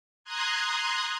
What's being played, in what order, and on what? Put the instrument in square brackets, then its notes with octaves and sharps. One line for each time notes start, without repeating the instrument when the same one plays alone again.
[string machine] A#5 C6 D#6 F#6 G#6